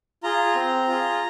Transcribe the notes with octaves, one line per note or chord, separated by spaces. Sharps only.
F4 G#4 A#5
C4
F4 G#4